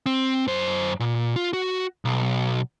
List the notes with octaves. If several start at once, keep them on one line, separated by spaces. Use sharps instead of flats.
C4
F#2 C5
A#2
F4
F#4
B1